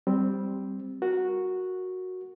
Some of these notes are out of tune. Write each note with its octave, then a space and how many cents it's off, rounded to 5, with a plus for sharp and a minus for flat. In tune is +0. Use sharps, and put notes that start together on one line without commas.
G3 +0 C4 +0
F#4 -5 A#4 +0